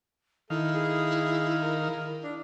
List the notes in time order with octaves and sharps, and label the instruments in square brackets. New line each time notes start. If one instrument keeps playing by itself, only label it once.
[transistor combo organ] D#3 F5 [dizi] E4 [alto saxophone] A4
[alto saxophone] G#4
A#4
D4